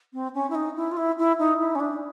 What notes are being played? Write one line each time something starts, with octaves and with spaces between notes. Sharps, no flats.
C4
C#4
E4
D#4
E4
F4
E4
E4
D#4
E4
C#4
D4